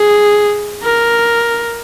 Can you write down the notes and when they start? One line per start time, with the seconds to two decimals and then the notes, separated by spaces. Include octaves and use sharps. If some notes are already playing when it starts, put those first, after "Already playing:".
Already playing: G#4
0.83 A#4